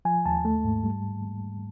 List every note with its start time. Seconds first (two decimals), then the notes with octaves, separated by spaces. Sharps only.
0.05 F3 G#5
0.26 D#2 A5
0.45 A3
0.64 G#2
0.84 G3